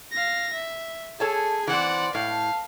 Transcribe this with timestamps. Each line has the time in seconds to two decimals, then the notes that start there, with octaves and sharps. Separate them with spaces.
0.12 F5 A#6
0.53 E5
1.20 G#4 A4 C#5 A5
1.67 E3 C4 C5 D5 F#5
2.15 A2 F5